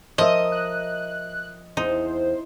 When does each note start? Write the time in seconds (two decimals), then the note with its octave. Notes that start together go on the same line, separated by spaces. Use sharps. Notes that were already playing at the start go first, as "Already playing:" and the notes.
0.18 F3 A#4 D#5 E5
0.52 F#6
1.77 E2 D#4 C5